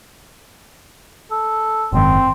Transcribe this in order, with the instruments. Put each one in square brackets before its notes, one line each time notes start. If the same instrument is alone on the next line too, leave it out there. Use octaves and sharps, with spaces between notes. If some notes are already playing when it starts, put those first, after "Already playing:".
[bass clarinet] A4
[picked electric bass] F#1 G#2 D#3 [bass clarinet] C4